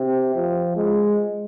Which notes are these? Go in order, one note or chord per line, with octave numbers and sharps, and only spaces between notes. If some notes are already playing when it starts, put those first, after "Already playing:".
Already playing: C3
F3
G#3